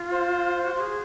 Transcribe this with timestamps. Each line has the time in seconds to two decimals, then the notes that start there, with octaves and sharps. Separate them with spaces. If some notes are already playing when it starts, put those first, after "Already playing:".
Already playing: F4
0.13 C5
0.64 F#4
0.76 F#4
0.80 G#4